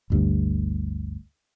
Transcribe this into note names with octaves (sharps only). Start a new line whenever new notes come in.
G1 D2 G2